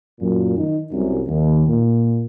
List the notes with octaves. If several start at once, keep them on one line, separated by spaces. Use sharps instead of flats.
F#2 A#2
D#3 D#4
C2 F#2
D#2
A#2